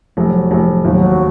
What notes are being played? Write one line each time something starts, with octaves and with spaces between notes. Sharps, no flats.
F1 F#3
F1
D#2 F#3